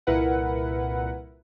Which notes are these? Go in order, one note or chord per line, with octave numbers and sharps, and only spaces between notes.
C2 A#2 E4 A#4 B4 F#5